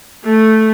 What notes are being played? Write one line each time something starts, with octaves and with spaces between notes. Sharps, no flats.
A3